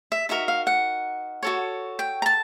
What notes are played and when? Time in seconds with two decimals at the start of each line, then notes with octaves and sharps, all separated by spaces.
0.12 E5
0.29 D#4 F#4 A#4 E5
0.48 F5
0.67 F#5
1.43 F#4 A4 C#5
1.99 G5
2.22 A#5
2.26 A5